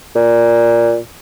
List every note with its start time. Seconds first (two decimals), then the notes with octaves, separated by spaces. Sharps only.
0.16 A#2